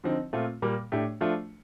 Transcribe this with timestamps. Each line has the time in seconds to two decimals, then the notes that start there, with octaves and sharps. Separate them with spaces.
0.04 D3 F3 C4 D#4
0.33 A#2 A3 C4 F4
0.62 A#2 G3 A#3
0.92 A2 A3 D4 G4
1.21 F3 A3 D4 F4